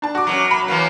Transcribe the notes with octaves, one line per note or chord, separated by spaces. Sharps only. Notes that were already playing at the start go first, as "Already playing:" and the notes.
D4 A5
F#4 D6
F#2 B2 F#3
B5
E3 F#3 A#3